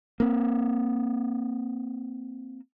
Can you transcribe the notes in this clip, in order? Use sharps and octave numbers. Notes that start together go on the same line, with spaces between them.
A#3 C4